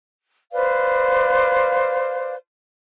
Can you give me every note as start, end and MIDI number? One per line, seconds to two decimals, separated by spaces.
0.53 2.35 71
0.53 2.35 72
0.53 2.35 74
0.53 2.35 77